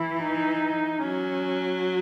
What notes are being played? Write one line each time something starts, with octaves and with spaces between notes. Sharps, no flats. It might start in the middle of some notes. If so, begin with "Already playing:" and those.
Already playing: E3 E4
D#4
F#3 C#4